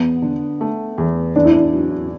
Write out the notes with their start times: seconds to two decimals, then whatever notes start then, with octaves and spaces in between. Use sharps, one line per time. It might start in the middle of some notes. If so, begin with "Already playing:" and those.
Already playing: E2 B3
0.22 D3
0.61 A3
0.98 E2
1.36 E2 D4
1.45 E4
1.53 D4
1.73 F#3